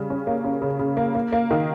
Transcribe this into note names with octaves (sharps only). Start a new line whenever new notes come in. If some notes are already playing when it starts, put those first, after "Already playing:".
Already playing: C#3 G3
C#4
A#3
C#4
C#3
C#3
A#3
A#3
A#3
D#3